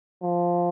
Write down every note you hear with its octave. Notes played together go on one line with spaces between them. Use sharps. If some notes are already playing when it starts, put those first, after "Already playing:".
F3